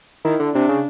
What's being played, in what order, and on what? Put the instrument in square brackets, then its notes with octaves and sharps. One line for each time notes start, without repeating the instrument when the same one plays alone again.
[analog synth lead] D#3 [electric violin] E4
[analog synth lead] D3
[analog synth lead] C3 [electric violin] D4
[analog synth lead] C#3